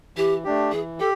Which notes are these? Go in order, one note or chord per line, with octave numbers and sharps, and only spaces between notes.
E3 G4
A3 D4 G4
E3 G#4
G4 A4